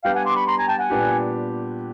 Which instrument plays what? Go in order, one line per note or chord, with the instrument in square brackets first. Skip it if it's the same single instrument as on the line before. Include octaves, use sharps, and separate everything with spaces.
[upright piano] G3 B3 D4 [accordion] F5 G5
[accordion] F#5 G#5
C6 D6
B5 C#6
A#5 C6
G#5 A#5
G5 A5
F#5 G#5
[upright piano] A#2 G3 B3 D4 G4